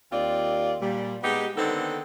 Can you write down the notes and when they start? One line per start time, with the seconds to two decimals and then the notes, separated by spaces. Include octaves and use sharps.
0.12 D#2 C4 F4 D5
0.81 A#2 G3
1.23 G#3 B3 D#4 G4
1.57 D3 D#3 B3 C4 D#4 A4